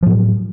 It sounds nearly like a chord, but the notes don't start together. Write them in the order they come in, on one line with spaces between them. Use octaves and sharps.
F3 A2 F#3